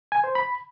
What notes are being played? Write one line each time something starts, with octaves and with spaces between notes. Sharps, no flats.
G#5
C5
B5